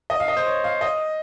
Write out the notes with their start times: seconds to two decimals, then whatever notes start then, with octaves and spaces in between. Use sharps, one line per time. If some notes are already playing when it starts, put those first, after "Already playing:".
0.10 D#5
0.20 F5
0.28 D#5
0.37 C5
0.47 C#5
0.64 F5
0.81 D#5